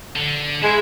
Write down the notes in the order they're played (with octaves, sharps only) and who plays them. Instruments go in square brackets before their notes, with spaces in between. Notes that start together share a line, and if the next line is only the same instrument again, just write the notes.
[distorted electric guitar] D3
[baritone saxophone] G#3 [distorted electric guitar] E4